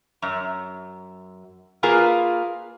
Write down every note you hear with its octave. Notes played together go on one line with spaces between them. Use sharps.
F#2
A#3 F4 G#4 A#4 B4